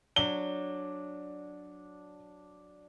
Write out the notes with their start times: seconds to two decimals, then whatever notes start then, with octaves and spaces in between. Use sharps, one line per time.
0.16 F#3 D4 G7